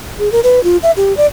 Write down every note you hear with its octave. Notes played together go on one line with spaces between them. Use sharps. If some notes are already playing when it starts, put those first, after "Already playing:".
G#4
A#4
B4
F4
E5
G4
D5